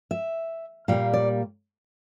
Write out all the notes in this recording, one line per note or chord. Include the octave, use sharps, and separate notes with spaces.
E5
A#2 G3 A#3 F5
D5